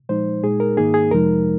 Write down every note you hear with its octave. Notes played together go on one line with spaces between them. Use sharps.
A#2 F3 G#3 D#4 C5
A#2 G#3 D#4 G#4
A#4
G#2 D#3 A#3 D#4 G#4
G#4
F2 C3 F3 G#3 D#4 A#4